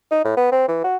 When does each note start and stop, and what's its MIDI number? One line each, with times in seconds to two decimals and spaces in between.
0.11 0.21 63
0.25 0.35 45
0.37 0.48 59
0.52 0.65 60
0.68 0.81 52
0.84 0.96 66